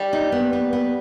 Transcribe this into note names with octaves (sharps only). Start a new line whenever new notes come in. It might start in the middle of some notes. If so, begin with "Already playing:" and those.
Already playing: G3
D#4
B3
B3
B3